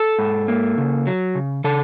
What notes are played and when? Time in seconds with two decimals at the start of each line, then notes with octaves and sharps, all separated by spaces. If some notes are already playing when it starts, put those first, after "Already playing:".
Already playing: A4 A5
0.19 G#2
0.48 A#3
0.78 C#3
1.07 F#3
1.35 C#3
1.64 C#3 A4 A5